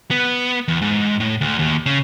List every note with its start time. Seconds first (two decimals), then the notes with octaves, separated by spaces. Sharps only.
0.11 B3
0.68 E2
0.82 G#2
1.20 A2
1.41 D2
1.59 D#2
1.86 C#3